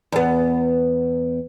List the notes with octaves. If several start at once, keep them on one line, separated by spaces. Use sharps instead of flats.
E2 B3